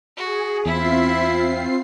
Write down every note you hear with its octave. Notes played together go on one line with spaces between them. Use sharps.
F#4 G#4
E2 C4 E4 F4 E5 C7